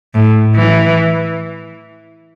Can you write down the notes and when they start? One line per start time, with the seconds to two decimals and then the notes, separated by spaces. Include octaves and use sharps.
0.14 A2
0.55 E3